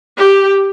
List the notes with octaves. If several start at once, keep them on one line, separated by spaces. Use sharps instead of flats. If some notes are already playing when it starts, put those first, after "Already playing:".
G4